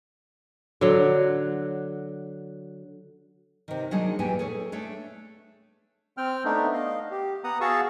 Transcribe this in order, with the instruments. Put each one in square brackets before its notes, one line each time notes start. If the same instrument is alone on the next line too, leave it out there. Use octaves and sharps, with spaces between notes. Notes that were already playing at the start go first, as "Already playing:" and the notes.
[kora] D3 F#3
[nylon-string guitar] C3 D#3
F#3 G#3 A#3 D4 D#4 G#4
E2 A#2 A#3 G4 G#5
G#4 A4 C#5
A3 D4 C#5
[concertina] C4 G5 F6
A3 B3 D4 D#4
D#5 F5
G4
B3 F#5 A#5 D#6
F#4 G#4 F5 A5 C#6 E6